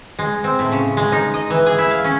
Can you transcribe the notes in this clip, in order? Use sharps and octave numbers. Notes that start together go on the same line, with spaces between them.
G#3
C4
A2
C#3
G#3
D#4
D#5
E3
G#4
E4
F5
C#4